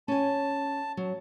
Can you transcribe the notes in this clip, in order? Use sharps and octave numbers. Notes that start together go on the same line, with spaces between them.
C#4 G#5 A5
F#3